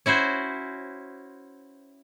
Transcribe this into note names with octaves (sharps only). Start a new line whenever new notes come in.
C#4 E4 F#4 C5